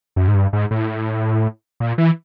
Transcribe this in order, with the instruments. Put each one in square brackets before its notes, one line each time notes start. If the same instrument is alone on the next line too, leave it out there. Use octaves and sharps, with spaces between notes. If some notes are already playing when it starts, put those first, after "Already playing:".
[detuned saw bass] F#2
G#2
G2
G#2
A2
A#2
E3